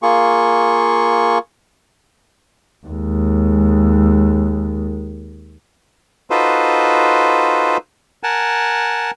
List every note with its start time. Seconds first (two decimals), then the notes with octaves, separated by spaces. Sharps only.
0.02 A#3 F4 G#4 C#6
2.87 D#2 G#3
6.30 D#4 F4 F#4 A4 B4 C5
8.23 A#4 F#5 G#5 A5